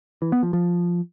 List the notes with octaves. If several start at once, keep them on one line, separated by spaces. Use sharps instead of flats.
E3
B3
F3
F3